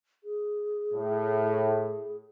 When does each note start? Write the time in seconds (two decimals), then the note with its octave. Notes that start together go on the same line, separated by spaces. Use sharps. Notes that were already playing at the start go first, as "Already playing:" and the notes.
0.24 G#4
0.94 A2